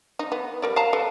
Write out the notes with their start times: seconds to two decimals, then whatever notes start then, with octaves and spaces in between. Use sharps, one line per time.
0.19 D#4
0.32 B3
0.62 G3 A#4 D5
0.76 F5 A5 A#5
0.93 A4 B4